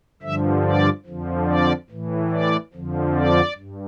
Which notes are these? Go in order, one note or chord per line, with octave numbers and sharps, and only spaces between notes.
G2 D3 F3 E5
D5
F2 D3 F3
D5
A2 E3
D5
F2 D3 F3
D5
G2